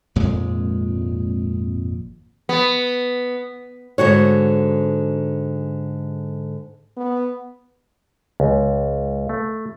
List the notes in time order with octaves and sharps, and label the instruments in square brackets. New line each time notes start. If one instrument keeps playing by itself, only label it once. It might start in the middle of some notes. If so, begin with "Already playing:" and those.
[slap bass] G#1 F2 A#2 G#3
[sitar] B3
[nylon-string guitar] G#2 D3 F#4 C#5
[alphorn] B3
[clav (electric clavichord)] C#2
A3